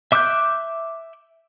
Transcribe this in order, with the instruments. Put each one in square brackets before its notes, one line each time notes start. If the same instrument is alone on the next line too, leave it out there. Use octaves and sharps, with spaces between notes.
[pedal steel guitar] E5 D6 E6 F#6 G6